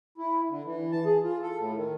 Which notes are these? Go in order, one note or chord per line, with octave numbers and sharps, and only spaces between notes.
E4
D3
E3
A5
G#4
F4
A4
A2
D#3